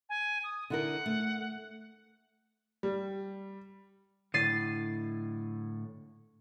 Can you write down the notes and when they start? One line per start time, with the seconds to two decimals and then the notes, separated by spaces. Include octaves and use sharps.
0.09 G#5
0.44 D#6
0.70 D3 E4 A#4 F#5
1.06 A3
2.83 G3
4.34 A2 D3 A6 C7 D#7